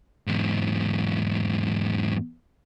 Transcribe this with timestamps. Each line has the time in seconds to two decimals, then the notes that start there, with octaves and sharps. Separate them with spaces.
0.27 E2 G#2